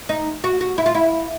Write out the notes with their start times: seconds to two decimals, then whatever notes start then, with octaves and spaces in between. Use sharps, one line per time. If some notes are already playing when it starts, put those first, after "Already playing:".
0.09 D#4
0.44 F#4
0.61 F#4
0.78 E4
0.86 F4
0.95 E4